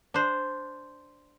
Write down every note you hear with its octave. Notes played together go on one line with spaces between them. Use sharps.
D4 C5